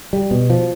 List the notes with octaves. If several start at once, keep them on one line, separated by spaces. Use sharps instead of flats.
G3
B2
F3